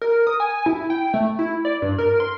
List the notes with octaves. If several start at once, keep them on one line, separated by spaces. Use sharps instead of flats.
A#4
D#6
G#5
E4
G5
A3
E4
D5
G2
A#4
C6